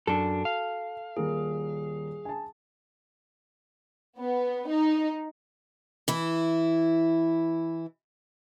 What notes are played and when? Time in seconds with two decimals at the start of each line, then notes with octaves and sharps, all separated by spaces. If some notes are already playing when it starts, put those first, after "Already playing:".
0.07 F#2 D4 F#4 A4
0.45 F5
1.17 D#1 A#3 G#4 A#4
2.25 G#5 A5
4.19 B3
4.69 D#4
6.08 E3 E4